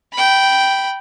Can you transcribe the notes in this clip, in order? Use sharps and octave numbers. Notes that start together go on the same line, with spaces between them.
G5 B5